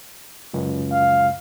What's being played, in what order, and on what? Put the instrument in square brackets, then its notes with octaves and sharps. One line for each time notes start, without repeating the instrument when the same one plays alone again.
[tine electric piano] C#2 F#2
[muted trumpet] F5